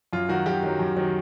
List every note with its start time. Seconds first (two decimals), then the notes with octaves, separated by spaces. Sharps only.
0.13 F#2 F4
0.29 D#3 F#3 F#4
0.46 F#2 G4
0.63 D#3 F#3
0.79 F#2
0.97 D#3 F#3